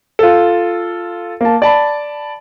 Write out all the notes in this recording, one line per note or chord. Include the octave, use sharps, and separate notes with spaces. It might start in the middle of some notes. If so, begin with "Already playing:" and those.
F4 A4
A#3 A5
D5 A5 B5